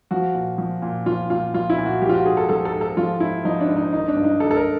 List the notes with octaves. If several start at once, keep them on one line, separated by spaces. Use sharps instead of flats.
F3 F#4
A#2
F3
A#2
F3 F4
A#2 F4
F3 F4
E4
A#2
F#4
F3 G4
F4
F#4
G#2 G#4
A4
F3 A4
A4
G#2
A4
F3 F4
G#2 E4
F3 D#4
D4
G#2
D#4
D#3 D#4
D4
G2
D#4
D#3 A4
A4
A#4